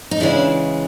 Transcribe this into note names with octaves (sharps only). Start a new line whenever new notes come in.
D#4
C#3 E3 G#3 D4 E4